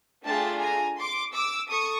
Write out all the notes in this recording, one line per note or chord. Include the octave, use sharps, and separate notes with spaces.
A3 D4 F4 G#4 G5 A5
G#5 A#5
C6 D6
D6 E6
A4 C#6 D#6